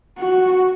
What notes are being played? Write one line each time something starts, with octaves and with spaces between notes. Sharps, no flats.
F#4